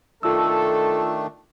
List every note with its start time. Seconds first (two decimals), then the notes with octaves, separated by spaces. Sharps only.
0.23 D#3 A3 D4 F4 A4 E6